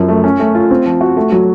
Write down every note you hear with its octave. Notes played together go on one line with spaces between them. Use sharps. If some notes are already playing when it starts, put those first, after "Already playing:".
Already playing: F#2 F3
A3
C#4
A3
F4
C4
F3
F#4
A3
F#3